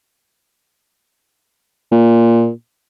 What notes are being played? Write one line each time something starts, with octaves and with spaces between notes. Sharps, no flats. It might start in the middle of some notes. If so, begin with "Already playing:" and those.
A#2